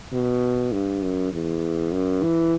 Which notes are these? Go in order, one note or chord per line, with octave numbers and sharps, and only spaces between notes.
B2
G2
F#2
E2
F#2
E3